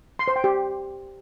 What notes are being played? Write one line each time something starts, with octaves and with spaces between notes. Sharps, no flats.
C6
C5
G5
G4